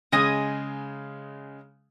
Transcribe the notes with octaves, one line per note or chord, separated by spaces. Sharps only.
C#3 G#3 D#5 G#5 D#6